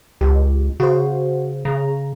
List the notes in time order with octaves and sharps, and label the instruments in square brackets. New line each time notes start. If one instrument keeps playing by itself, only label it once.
[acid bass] C#2 [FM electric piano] G4
[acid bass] C#3 [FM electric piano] F#4 C5
[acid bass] C#3 [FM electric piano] A#5